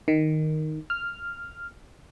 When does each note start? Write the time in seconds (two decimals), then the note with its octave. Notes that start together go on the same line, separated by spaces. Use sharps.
0.08 D#3
0.90 F6